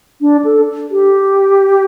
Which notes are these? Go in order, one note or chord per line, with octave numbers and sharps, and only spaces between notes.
D4
A4
G4